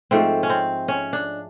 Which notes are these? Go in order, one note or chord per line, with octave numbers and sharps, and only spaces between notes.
G#2 F3 A3 C4
C#4
C4
C#4
D4